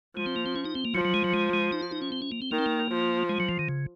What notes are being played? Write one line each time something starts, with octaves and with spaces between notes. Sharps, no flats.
F3 G#3
C4
A#3
C4
C#4
D#4
C4
A#3
F3 F#3
F#3
G#3
F#3
G#3
G#3
D#4
F4
D#4
C#4
C4
C#4
A#3
C4
D#3 A#3
C4
A#3
F3
G#3
F#3
F3
D#3
C#3